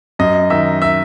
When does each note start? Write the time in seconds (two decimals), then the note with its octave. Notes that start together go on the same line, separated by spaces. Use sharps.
0.19 F#2 D#5
0.50 D#3 E5
0.82 E5